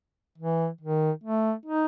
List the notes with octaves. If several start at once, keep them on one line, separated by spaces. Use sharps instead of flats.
E3
D#3
A3
D#4